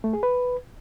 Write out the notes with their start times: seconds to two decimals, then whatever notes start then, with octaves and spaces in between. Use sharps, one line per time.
0.04 A3
0.13 G#4
0.23 B4